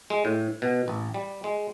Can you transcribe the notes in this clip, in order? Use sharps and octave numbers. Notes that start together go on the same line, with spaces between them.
G#3
A2
B2
A1
G3
G#3